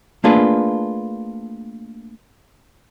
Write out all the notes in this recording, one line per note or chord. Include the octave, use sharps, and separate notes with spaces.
A3 A#3 D4 F4 G#4 B4